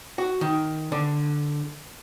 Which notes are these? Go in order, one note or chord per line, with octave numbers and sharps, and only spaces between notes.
F#4
D#3
D3